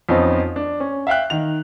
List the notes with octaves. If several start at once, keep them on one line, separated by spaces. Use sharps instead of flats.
F2 F3 B3 C#4 D#4
D4
C#4
E5 F5 G5 F#6
D#3 F7